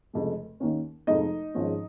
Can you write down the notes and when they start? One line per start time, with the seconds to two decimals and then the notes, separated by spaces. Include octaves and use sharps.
0.13 F1 F2 C#3 G#3
0.60 D#2 D#3 A#3 C#4
1.07 F1 F2 F3 G#3 D#4 D#5
1.54 G#1 G#2 F3 G#3 C#4